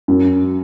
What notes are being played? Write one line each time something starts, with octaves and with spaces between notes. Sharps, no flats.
F#2